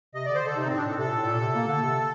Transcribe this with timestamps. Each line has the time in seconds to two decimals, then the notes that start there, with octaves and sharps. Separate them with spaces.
0.14 C3 D#5
0.26 D3 D5
0.35 C5
0.43 D3 A4
0.56 C3 D#4
0.67 A2 C4
0.77 D4
0.85 A2 A4
0.99 C3 A4
1.08 A#2
1.17 A2
1.26 A#2
1.41 C3
1.55 A#3
1.68 D3
1.82 C3